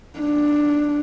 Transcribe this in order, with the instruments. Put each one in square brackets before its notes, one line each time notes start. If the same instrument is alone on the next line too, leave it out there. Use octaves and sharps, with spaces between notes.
[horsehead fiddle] D4